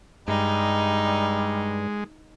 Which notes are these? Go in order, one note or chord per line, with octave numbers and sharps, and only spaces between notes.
G2 G3 G#3 D#4